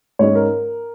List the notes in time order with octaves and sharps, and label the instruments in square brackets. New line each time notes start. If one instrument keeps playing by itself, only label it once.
[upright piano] G#2 G#3 C#4 C#5
A#4